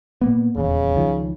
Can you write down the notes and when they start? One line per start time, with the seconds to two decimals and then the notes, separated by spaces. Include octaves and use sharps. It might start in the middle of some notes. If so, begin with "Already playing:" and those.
0.21 A#2 A#3 B3
0.56 D#1 E2 C#3
0.95 C#2 D#3 F3